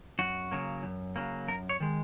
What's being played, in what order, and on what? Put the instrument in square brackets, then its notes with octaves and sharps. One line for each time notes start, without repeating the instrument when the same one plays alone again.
[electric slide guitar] F#2 F#4
C#3 F#3 A#3
F#2
C#3 F#3 A#3
F#2 A#4
C#5
D#3 G#3